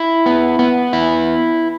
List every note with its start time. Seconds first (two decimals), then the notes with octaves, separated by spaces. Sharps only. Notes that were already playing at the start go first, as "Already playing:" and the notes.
Already playing: E4
0.26 B3
0.59 B3
0.93 E4